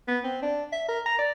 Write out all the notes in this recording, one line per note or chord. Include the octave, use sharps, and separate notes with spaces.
B3
C4
D4
E5
A#4
A#5
D5